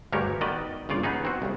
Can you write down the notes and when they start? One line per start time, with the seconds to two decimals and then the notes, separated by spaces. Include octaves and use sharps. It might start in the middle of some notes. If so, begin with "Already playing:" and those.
0.12 D2 G2 G#3 G4 A#4 C#5
0.41 D#3 B3 D5 D#5
0.89 G1 C#3 F4 D5
1.03 B3 C#4 D#4 G#4
1.25 C4 F#4
1.42 C2 C#3